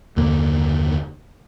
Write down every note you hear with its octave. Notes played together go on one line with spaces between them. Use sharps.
F#1 D#2 D3 A#3